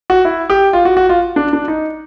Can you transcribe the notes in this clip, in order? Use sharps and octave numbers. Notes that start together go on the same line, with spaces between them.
F#4
E4
G4
F4
F#4
F#4
F4
D4
D4
D#4